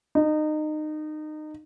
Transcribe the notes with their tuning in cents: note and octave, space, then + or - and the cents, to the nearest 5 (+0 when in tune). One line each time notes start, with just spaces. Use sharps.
D#4 -25